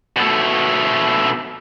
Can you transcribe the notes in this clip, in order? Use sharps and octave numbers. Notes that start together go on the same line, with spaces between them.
B2 A3